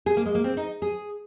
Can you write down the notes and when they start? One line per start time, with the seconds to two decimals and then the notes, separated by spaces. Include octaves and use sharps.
0.06 G#4
0.17 A#3
0.26 G#3
0.35 A#3
0.44 C4
0.57 D#4
0.82 G#4